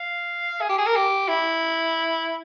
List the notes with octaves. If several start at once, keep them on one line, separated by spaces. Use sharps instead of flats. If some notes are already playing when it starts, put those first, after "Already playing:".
Already playing: F5
G#4
G4
G#4
A#4
G4
E4